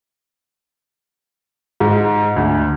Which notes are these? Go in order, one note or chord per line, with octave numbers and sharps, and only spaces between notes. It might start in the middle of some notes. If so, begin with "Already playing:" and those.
G#2
D2